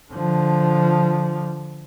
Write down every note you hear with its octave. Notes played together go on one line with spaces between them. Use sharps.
D3 F3